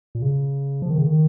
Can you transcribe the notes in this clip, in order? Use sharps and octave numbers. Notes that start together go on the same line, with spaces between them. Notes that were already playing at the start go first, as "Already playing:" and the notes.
A#2
C#3
F3
D#3
C#3
D#3